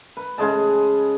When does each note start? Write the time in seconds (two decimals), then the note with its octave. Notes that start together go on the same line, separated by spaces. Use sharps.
0.17 B4
0.38 C#3 G#3 G#4 A5